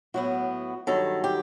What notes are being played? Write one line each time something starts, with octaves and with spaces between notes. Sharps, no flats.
A2 F#3 B3 F#4
G2 D#3 F#3 A4
G4